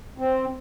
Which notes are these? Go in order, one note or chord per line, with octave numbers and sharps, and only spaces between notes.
C4